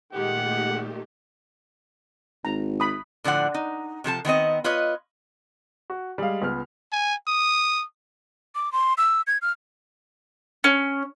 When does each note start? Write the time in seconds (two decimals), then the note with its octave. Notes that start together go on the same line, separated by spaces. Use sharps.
0.13 A#2 D#3 G#3 A3 G4 F#5
2.45 G#1 A#5
2.80 B5 D#6
3.24 A2 D3 F3 D5 F#5
3.54 D#4
4.04 C3 F3 A4 A5
4.25 D#3 B3 C4 D#5
4.64 F4 B4 C#5 D#5
5.90 F#4
6.18 G3 G#3 G#4 F5
6.42 C#2 B3 F6
6.92 G#5
7.28 D#6
8.55 D6
8.73 C6
8.98 E6
9.27 G#6
9.42 F6
10.64 C#4